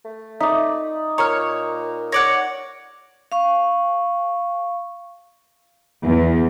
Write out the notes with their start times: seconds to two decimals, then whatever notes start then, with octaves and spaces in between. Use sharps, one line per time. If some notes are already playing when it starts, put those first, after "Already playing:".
0.05 A3
0.41 D#4 D5 E5 D6
1.18 A#2 C#5 A#5 F6
2.12 C#5 D5 F#5 A#6
3.32 F5 C#6
6.05 E2